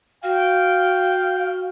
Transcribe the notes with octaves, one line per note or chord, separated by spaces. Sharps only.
F#4 F5 G5